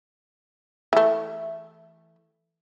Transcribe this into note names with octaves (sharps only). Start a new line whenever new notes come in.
E3 A3